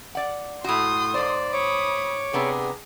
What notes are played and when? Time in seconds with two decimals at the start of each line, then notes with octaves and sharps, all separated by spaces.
0.15 D5 F#5
0.64 A2 F#4 C6 D#6
1.14 G#2 C5 D5
1.53 C#5 B5 D6 D#6
2.33 C3 B3 D4 G#4 A#5